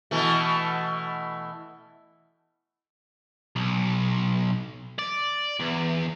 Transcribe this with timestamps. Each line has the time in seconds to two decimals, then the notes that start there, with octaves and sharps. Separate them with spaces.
0.11 B2 E3 A3
3.56 B1
4.99 D5
5.59 E2